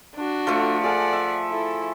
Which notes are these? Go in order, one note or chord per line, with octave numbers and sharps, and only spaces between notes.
D4 F#4
F3 A3 A4 F5 F#5
G#4 A4 D5 F5 F#5
E5
E4 A4